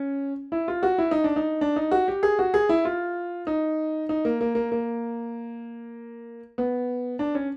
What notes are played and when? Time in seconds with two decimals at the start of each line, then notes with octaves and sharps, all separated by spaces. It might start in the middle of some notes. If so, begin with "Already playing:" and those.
Already playing: C#4
0.52 E4
0.68 F4
0.83 F#4
0.98 E4
1.11 D#4
1.24 D4
1.36 D#4
1.61 D4
1.76 D#4
1.91 F#4
2.08 G4
2.23 G#4
2.39 F#4
2.54 G#4
2.69 E4
2.85 F4
3.47 D#4
4.09 D#4
4.25 A#3
4.41 A#3
4.55 A#3
4.72 A#3
6.58 B3
7.19 D4
7.35 C#4